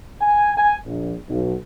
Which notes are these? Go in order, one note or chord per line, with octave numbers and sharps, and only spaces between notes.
G#5
G#5
A#1
B1